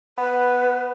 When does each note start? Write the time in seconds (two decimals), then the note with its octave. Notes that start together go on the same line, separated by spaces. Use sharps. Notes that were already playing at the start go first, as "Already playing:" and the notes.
0.18 B3 B4